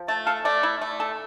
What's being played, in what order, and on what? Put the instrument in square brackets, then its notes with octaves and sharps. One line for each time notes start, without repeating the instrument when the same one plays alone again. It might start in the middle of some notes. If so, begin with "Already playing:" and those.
Already playing: [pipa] F3
[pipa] A3 [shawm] A5
[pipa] A4 [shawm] F5
[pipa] A3 [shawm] D5
[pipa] E4
A3
A4